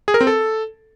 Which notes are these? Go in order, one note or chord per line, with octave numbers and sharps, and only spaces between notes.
G#4
A#4
C4
A4